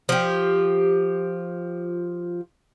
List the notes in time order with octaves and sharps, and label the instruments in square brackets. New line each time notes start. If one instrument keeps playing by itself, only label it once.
[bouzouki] F3 G4